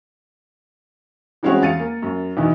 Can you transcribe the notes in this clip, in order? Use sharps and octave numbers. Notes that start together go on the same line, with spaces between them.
E3 G3 G#3 C4 C#4 F#4
E2 F5 A6 C#7 D#7
A#3
F#2
E2 B2 D#3 E3